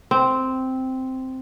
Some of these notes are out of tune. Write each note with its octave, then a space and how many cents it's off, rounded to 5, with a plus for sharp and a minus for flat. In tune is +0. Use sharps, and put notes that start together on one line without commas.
C4 -5